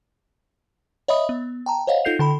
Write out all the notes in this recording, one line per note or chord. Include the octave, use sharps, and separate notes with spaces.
C#5 D#5 E5 B5 D#6
B3
G5 A5 A#5
C5 C#5 D#5 F5 F#5
D#4 F4 A4 G6 C7 F7
D3 A4 B5